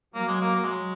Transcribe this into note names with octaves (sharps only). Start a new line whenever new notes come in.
F#3 A#3
G#3
A#3
A#3
G#3